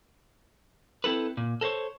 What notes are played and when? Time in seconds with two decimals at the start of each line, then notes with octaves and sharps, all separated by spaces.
1.04 C4 E4 A4 B4
1.37 A#2
1.61 A4 A#4 C5 C#5